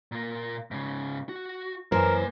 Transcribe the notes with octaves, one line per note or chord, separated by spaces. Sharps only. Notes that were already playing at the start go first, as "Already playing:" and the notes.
A#2 A#3
G#2 C#3
F#4
F#2 E3 A#3 A#4 C5 G#5